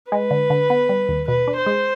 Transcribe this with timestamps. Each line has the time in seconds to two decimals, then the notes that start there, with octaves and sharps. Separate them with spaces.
0.11 G#3 B4
0.31 D3
0.50 D3
0.70 B3
0.89 G3
1.09 D#2
1.28 B2 B4
1.47 D4
1.57 C5
1.66 G#3